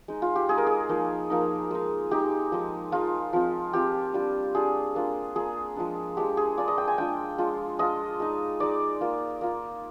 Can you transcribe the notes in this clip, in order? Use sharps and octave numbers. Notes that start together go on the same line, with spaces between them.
G#3 D#4
F4
G4
G#3 D#4 G#4
A#4
G#4
F3 A#3 D#4
F3 A#3 D#4
G#3 D#4
G#3 D#4 G4
F3 G#3 D#4
F3 G#3 D#4 F4
F3 C4 F4
F3 C4 F4 G4
G3 D4 F4
G3 D4 F4 G#4
A#3 D4 F4
A#3 D4 F4 G#4
F3 G#3 D4
F3 G#3 D4 G4
G#4
G#3 D4 F4 D5
D#5
G5
G#5
G#3 D4 F4 G5
G#3 D4 F4
G#3 D4 F4 D#5
G#3 D#4
G#3 D#4 D5
A#3 F4
A#3 F4